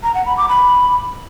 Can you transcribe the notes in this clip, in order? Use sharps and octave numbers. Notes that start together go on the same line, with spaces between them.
A#5
F#5
B5
D6
B5